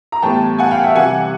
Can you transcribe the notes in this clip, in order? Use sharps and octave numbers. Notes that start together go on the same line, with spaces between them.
A#5
A2 E3 G3 B3 G5 A5
F#5 G#5
F5 G5
E5 F#5
C3 E3 G3 F#5 G#5